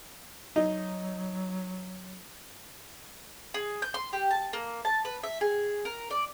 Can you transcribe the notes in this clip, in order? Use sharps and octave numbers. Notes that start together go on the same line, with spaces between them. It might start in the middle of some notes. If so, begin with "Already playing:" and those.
F#3 D#4
G#4
G6
C6
G4
A5
A#3
A5
B4
E5
G#4
A#4
D5